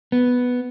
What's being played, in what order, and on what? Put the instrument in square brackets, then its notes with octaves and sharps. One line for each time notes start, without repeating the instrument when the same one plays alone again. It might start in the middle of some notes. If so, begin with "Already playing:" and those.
[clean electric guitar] B3